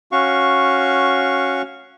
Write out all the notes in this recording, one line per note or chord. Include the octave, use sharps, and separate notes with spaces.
C#4 F#4 F5 C#6